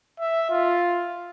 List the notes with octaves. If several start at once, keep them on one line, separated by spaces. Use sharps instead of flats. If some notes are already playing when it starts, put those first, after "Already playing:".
E5
F4